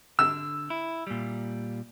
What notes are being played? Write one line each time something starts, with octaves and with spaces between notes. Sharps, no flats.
D3 E6
E4
A#2 G3